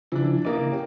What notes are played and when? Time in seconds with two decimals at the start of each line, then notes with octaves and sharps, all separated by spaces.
0.12 C#3 E3 F3 D4
0.45 E3 A#3 D#5 D6
0.58 C#3
0.72 C#4 G4